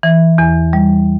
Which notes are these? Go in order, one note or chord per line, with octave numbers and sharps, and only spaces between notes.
E3
E2
G3